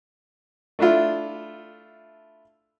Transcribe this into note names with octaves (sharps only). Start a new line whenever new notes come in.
A3 D4 E4 F4